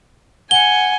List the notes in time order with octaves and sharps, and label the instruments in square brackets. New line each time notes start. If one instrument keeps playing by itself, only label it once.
[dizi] F#5 [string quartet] G#5 [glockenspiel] G7